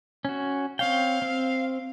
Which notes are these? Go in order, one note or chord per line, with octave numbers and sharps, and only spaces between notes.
C#4 F#4
C4 C#5 F5 G5
C4